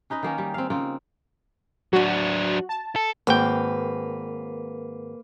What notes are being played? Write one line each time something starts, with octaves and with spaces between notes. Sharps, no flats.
C#4 D#4 B4 D#5
D#3 A#3 C#4
G3
C4 F5
C#3 A#3 C4 F4
F#3 D4 F#4
A5
A4
G#1 A#3 B4 G5